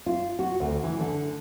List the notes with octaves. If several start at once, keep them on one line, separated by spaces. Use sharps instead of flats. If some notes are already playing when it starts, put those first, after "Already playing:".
F4
F#4
D2
E3
D3